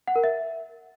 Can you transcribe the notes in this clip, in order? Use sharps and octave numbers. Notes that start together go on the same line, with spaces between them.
F#5
A#4
E5